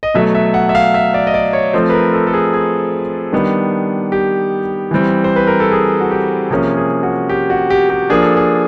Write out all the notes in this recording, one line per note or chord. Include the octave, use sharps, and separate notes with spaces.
D#5
B2 F#3 A3 E5
E5
F#5
E5
F5
E5
D5
D#5
D5
C#5
F3 A3 C4 C5
B4
A#4
A4
A4
G#4
G#4
D#3 G3 B3 D4
G4
E3 G3 C4
C5
B4
A#4
A4
G#4
F#4
G4
C3 F3 A#3 C#4 G#4
G#4
F#4
G4
F#4
G4
G4
F3 A#3 D4 G#4
A4
G#4